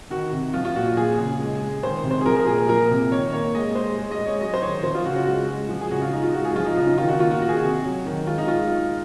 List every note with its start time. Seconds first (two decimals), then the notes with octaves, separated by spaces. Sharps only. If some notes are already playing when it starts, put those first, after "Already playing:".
0.10 D#3 F#4
0.32 C3
0.54 F3 F4
0.65 F4
0.76 A#2 F#4
0.97 F3 G#4
1.18 C#3
1.40 G#3
1.61 G#3
1.83 D#3 C5
2.04 C3
2.11 C5
2.21 G#4
2.26 F3 A#4
2.36 A#4
2.47 A#2 G#4
2.58 A#4
2.69 F3 A#4
2.90 C3
3.11 D#3 C#5
3.33 A#3 C#5
3.55 G#3 D#5
3.76 G#3 C5
3.98 G#3
4.11 D#5
4.18 G#3
4.26 C#5
4.41 F#3 D#5
4.54 C5
4.62 D#3 C#5
4.83 F3 C5
4.95 F4
5.05 C#3 F#4
5.16 F#4
5.26 G#3 F#4
5.48 G#3
5.69 F3
5.81 G#4
5.91 C#3 F#4
6.02 F4
6.12 G#3 D#4
6.23 F4
6.33 G#3 F#4
6.45 G#4
6.55 F3 F4
6.66 D#4
6.77 C#3 D#4
6.87 F4
6.98 D#3 F4
7.09 F#4
7.20 A#3 F4
7.31 F#4
7.41 D#3 F#4
7.49 G#4
7.56 F#4
7.63 C3
7.85 F#3
8.06 D#3
8.27 G#3 F4
8.38 D#4
8.48 G#3 F4